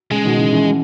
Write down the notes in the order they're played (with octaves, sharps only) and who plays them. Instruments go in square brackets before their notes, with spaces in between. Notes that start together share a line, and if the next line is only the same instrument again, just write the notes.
[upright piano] C#3 [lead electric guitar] G#3
[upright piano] B2 D#3
C#3 E3
C#3 E3